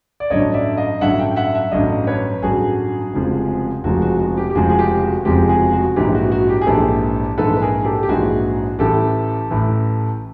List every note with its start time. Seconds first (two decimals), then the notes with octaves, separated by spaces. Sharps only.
0.20 D5
0.30 A1 G2 D3 F#3 C#5 D#5
0.54 D5 E5
0.77 D#5 F5
1.01 A1 G2 D3 F#3 E5 F#5
1.19 F5 G5
1.36 E5 F#5
1.55 E5 F#5
1.72 A1 G2 D3 F#3 D#5 F5
2.07 B4 C#5
2.43 A1 G2 D3 F#3 F#4 G#4
3.13 F1 F2 C#3 F3 G#3
3.84 F1 F2 C#3 F3 G#3 F#4
4.02 F#4
4.20 F#4
4.37 G4
4.50 G4
4.55 F1 F2 C#3 F3 G#3 F#4 G#4
4.70 G#4
4.79 G4
5.02 F#4
5.21 F#4
5.25 F1 F2 C#3 F3 G#3 G4
5.49 F#4 G#4
5.73 F#4
5.96 A#1 G#2 E3 G4
6.15 F#4
6.32 F#4
6.49 G4
6.61 G#4
6.67 A#1 G#2 E3 G4 A4
7.38 A#1 G#2 E3 A4 B4
7.57 B4
7.62 G#4 A#4
7.85 G4 A4
8.03 G4
8.08 A#1 G#2 E3 F#4 G#4
8.79 A1 A2 E3 G4 A4
9.51 A1 A2 E3